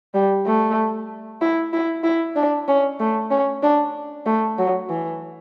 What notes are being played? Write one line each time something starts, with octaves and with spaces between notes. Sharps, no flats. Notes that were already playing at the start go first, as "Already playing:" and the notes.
G3
A3
E4
E4
E4
D4
C#4
A3
C#4
D4
A3
F#3
E3